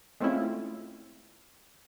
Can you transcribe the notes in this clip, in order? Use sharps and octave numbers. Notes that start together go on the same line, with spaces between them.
G#3 A3 C4 C#4 E4 F4